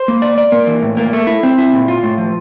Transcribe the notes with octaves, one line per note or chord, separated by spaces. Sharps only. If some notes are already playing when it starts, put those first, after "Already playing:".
Already playing: C5
A#3
D5
D5
A#3
E3
A2
A#3
A3
E4
C4
E4
A#2
F4
A2
F3